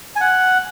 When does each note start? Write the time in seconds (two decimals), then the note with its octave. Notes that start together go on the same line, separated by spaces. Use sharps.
0.16 G#5
0.21 F#5